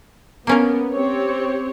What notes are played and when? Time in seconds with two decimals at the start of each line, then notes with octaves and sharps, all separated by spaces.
0.47 A#3 B3 C#4 A#4
0.93 C4 G4 C#5